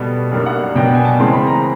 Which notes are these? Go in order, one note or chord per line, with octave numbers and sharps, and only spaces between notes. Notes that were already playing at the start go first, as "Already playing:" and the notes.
Already playing: B2 G3 B3 A4
F#2 D#3 G3 A#3 D4
F#5
B2 F#3 B3 D4 G5
G#5
A5
C#3 E3 G#3 C4 C6
B5
A#5